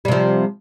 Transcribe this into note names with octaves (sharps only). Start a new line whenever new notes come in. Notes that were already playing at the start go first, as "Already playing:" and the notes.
C3 F3 G3